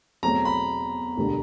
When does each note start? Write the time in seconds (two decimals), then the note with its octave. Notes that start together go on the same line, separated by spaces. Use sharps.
0.23 E2 B2 F#3 A3 C4 A#5
0.45 B5
1.17 E1 D2 D3 G3